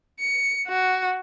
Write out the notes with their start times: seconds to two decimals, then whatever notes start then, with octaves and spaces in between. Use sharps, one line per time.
0.20 C#7
0.68 F#4